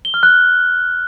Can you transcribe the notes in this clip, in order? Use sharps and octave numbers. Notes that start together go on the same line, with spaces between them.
G7
F6
F#6